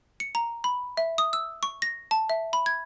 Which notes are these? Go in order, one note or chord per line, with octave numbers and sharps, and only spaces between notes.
C#7
A#5
B5
E5
D#6
E6
C#6
A#6
A5
E5
B5
G#6